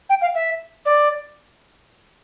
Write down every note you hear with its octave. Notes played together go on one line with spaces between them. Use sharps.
G5
F5
E5
D5